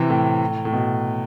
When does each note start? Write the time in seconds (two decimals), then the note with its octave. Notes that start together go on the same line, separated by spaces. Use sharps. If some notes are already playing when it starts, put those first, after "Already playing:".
Already playing: C3 E3
0.10 A2
0.65 A2
0.72 B2